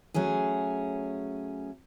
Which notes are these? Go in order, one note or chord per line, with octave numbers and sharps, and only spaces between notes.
F#3 A3 C#4 G#4